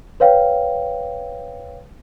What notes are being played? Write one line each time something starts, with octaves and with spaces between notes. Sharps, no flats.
B4 C#5 F5 G5